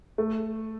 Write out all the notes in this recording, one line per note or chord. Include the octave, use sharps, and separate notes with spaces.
A3